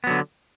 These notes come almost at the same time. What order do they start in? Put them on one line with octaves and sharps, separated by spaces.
B3 F#3 D3